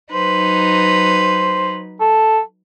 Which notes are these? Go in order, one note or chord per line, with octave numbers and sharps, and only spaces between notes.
F#3 D#4 B4 C5
A4